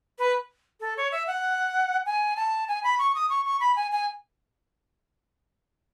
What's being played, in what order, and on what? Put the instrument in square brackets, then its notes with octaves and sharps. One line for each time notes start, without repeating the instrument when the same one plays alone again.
[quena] B4
A4
C#5
E5
F#5
G#5
A5
G#5
B5
C#6
D#6
C#6
C#6
B5
G#5
G#5